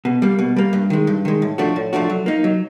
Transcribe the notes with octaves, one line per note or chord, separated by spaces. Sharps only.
B2
G3 A#3
B2
G3 A#3
G2
D#3 G#3
G2
D#3 G#3
A2
F3 A3 D4 F#4
A2
F3 A3 D4 F#4
F#3
A#3 D#4
F#3